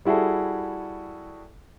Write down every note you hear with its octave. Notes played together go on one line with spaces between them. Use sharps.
G3 E4 F#4 G#4 A4